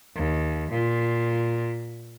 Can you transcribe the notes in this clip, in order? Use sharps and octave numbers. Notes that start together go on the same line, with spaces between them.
D#2
A#2